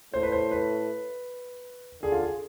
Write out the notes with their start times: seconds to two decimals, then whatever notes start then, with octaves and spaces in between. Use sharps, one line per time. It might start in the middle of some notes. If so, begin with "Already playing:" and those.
0.14 A2 C5
0.23 B4
0.32 C5
0.51 B4
2.02 D3 G#4
2.12 F4
2.21 G#4